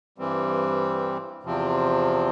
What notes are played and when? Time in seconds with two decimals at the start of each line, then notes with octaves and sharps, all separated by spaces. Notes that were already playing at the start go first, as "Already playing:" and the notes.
0.18 G2 E3 G3 C4
1.43 E2 C3 F3 C4